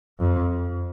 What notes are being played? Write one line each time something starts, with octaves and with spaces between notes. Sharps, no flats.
F2